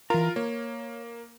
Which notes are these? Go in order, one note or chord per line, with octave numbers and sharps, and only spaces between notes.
E3 F4 A#4 A#5
A#3 C#5